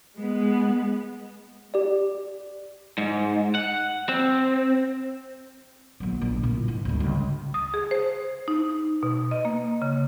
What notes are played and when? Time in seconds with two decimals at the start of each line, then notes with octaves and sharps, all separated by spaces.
0.17 G#3 B3
1.74 G4 D5
2.98 G#2
3.55 F#5
4.09 C4
6.00 A#1 F#3
6.21 A#1
6.43 A#2 E4
6.68 G#2
6.85 D2 G2
7.00 C#2
7.54 D#6
7.74 G#4
7.91 C5
8.48 D#4
9.03 B2
9.31 D#5
9.45 A#3
9.82 C#3